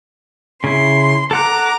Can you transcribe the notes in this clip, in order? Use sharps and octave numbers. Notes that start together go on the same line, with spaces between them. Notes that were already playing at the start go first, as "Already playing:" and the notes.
C#3 E4 C6
A4 F#5 A#5 D6 F#6